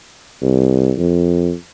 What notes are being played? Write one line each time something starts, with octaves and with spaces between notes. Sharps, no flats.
C2
F2